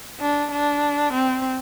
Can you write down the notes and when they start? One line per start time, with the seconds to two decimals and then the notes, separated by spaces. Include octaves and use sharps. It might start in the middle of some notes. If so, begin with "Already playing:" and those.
0.20 D4
0.51 D4
1.13 C4